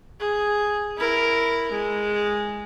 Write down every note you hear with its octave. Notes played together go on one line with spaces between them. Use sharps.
G#4
E4 A#4
G#3